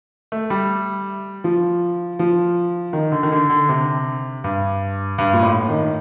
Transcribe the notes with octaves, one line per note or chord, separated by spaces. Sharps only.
A3
G3
F3
F3
D#3
D3
D#3
D3
D3
C3
G2
G2
A#2
A2
D#3